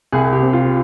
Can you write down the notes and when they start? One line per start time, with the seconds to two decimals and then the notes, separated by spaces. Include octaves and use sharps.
0.12 C2 G#4
0.32 G4
0.42 C4
0.53 F4